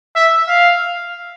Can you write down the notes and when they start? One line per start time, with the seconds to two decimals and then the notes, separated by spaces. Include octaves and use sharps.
0.16 E5
0.48 F5